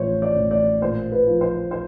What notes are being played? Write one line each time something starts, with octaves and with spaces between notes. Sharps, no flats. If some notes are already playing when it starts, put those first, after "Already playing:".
Already playing: A1 F3 C5 C#5
D5
A1
D5
A#2 C5
B4
F3
C5
C5